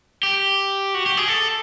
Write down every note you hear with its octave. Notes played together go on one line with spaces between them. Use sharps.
G4
F#4
G4
G#4
A4